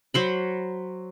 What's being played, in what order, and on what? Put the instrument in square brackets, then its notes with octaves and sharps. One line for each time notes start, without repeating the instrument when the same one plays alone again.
[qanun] F#3 C5 B5